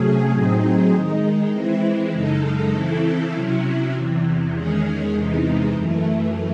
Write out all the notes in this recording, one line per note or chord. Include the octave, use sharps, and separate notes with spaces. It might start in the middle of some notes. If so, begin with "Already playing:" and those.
Already playing: C3 F#3 A3 C#4 G#4
A2 F#3 C4 D#4 G#4
D#3 G#3 D#4
E3 G#3 C4 E4
F#2 C#3 G#3 D#4 A4
C#3 E3 C4 E4 A4
C3 F#3 C#4 E4
E2 C3 E3
E2 D#3 G#3 C#4 G#4
E2 C3 E3 G#3 D#4
F#2 E3 A3